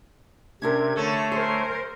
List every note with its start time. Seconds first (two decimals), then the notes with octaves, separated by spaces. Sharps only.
0.62 C3 C#4 D4 A#4 G#6
0.96 D3 A3 A4 C#5
1.32 G#4 A#4 C5